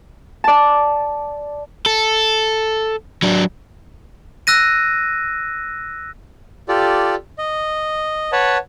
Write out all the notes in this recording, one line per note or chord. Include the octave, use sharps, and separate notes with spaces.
D5 A5
A4
F#3 D4
E6 F#6 A#6 D#7
F4 G4 A4 D5
D#5
B4 C#5 F#5 A5